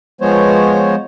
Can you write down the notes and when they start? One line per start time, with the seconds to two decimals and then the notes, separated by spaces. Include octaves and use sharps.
0.21 F3 G#3 B3 C5 C#5